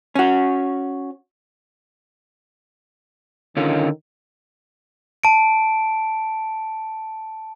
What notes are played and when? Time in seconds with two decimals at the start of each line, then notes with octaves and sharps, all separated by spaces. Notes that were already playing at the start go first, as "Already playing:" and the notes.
0.15 C#4 F#4
3.57 D3 D#3 C#4 F4
5.24 A5 D7